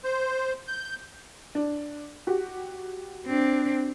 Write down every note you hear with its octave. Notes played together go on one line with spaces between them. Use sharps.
C5
G6
D4
F#4 G4
C4 D4